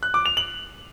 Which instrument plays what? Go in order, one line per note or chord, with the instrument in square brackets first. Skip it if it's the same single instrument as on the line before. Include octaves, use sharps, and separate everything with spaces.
[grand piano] F#6
D6
F7
F#7